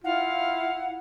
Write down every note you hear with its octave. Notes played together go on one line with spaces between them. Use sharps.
E4 F4 F5 F#5